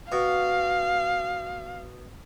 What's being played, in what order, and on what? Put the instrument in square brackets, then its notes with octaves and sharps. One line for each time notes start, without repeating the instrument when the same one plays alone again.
[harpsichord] B2 [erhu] F5